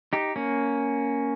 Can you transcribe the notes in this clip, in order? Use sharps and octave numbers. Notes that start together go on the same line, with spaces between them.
D#4 G4
A#3 C#4